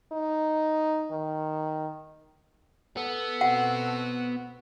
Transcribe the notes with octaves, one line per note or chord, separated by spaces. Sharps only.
D#4
D#3
B3 A4
B2 C4 F#4 F#5